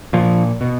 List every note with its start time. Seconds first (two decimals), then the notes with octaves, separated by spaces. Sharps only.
0.13 A#2 F3
0.61 B2